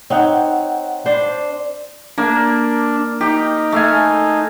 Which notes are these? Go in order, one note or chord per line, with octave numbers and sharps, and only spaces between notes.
C4 D#4 C#5 F#5
D4 C5
A#3 D4
D#4 G4
A3 F5 G#5